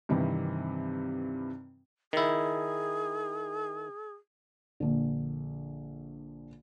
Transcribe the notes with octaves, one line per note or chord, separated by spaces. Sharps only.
G2 C3 D#3 E3
D#3 E4 G#4
A#1 D3